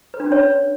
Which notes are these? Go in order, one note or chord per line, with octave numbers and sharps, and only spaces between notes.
B4
D4
C#4
C#5